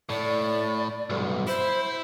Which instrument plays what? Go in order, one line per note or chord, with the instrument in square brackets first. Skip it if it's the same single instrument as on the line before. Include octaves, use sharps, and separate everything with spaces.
[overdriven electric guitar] A2 [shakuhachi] D5
[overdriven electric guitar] B1 G2
[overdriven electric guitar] E4 [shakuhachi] C5